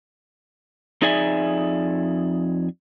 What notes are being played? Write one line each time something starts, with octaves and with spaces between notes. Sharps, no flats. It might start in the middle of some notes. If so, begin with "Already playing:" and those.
F2 D#4 G#4 D5 E5 G#5